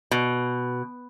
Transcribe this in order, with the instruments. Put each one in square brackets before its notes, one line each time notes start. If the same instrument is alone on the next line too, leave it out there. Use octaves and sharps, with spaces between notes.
[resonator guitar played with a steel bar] B2